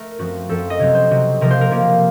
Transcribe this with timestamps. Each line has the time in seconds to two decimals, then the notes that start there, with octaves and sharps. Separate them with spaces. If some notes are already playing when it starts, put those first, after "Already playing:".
Already playing: A3 A#4
0.18 F#2 F3 C4 F#4
0.49 F#2 F3 C4 A4
0.70 D#5
0.79 C3 F#3 C4 C#5
0.94 C5
1.10 C3 F#3 C4
1.41 C3 F3 A#3 A#4
1.51 C5
1.61 A#4
1.71 C3 F3 A#3